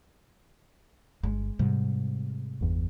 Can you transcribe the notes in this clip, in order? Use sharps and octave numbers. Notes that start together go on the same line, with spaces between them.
G1 G#3
G#2 C3 G3
G1 E2